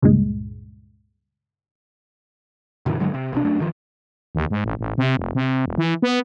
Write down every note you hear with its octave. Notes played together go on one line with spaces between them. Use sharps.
C#2 G2 A#2 G#3
F#2 A#2 D3 E3
G2 D3 F#3 G#3
C3
B1 C3 D4
G1 F#2 A3 D4
G1 D#3 F3
D#2
G#2
A1
A1
C3
F1
C3
E1
E3
B3